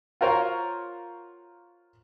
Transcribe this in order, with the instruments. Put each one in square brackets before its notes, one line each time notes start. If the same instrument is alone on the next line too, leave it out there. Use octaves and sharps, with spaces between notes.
[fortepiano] F4 F#4 A#4 C5 C#5 F5